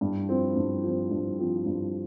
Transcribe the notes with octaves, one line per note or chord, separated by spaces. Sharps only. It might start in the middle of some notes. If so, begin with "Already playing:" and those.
G2
F3 C4
G2
F3 C4
G2
F3 C4
G2